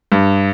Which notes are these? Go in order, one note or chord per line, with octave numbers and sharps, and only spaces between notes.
G2